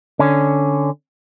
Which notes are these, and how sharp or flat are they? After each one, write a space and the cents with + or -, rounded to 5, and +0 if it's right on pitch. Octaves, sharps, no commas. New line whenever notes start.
D3 +0 C#4 +0